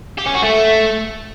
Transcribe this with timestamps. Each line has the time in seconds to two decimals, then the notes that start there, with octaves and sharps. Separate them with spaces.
0.18 G4
0.26 C#4
0.35 F#4
0.43 A3